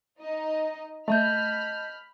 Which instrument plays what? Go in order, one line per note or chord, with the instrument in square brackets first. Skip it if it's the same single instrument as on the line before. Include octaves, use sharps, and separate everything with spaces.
[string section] D#4 D#5
[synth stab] A3 [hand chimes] D#5 A5 G6 [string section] B5 F6